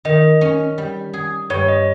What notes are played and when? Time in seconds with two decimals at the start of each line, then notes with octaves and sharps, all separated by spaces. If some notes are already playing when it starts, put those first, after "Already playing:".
0.05 D#3 D#5
0.41 C#4
0.78 G3
1.13 G#4
1.50 G2 C#5
1.68 D#5